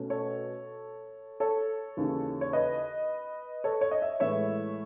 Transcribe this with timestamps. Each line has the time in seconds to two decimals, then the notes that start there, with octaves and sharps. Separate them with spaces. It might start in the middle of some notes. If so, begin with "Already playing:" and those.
Already playing: B2 A3 C#4
0.10 A4 C#5
1.40 A4 C#5
1.97 D#2 C#3 E3
2.41 C#5
2.53 B4 D#5
3.64 A4 C#5
3.81 C#5
3.91 D#5
4.02 C#5 E5
4.20 A2 E3 G#3 B3 C#5 E5